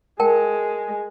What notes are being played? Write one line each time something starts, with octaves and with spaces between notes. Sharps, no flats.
G#3 A#4 G5 A5